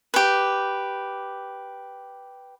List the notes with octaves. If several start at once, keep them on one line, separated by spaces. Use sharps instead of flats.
G4 B4